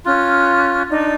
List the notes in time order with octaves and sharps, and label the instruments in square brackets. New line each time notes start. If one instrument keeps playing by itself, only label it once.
[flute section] C#4 F6 F#6 [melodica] F4
[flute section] D4 D#4 D5